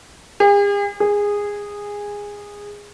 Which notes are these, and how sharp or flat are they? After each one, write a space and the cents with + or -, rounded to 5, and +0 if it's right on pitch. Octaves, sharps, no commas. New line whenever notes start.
G#4 -45
G#4 -15